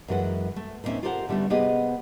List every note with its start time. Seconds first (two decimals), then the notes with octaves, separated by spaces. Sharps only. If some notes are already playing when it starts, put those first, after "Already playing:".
0.08 F#2 E3 G#3 A4 B4 F#5
0.56 A3
0.84 D#2 A#2 D#3 C4 C#4 E5
1.03 F4 G4 A4 A#4 C5 F#5
1.29 D3 G3 A3 B3 C#4
1.50 C3 B3 G4 G#4 D#5